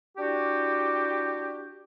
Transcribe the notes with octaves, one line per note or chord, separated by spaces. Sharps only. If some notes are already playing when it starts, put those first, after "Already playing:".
D4 E4 F#4 G4